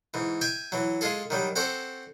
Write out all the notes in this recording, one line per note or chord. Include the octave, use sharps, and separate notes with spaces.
G#2 E3
E5 G5 G#5
E3 F#3
G#3 F4 G#4 A4
D#3 F#3 G3
C4 F#4 A4 C5 D5